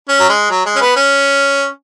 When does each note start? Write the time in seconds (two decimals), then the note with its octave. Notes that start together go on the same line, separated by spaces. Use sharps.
0.09 C#4
0.20 F#3
0.29 G#3
0.51 F#3
0.66 G#3
0.76 C#4
0.81 B3
0.96 C#4